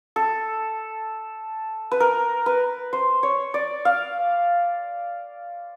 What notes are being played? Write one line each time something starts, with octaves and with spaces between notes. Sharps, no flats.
A4
B4
A#4
B4
C5
C#5
D5
F5